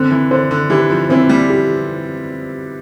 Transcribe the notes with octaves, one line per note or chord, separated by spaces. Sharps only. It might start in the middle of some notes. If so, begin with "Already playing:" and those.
Already playing: D3 C4
E3
D3 C5
D3
E3 G4
F3
E3 C4
G3
G4